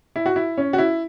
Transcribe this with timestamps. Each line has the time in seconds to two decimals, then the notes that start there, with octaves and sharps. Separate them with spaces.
0.16 E4
0.26 F#4
0.36 E4
0.58 C#4
0.73 F#4
0.78 E4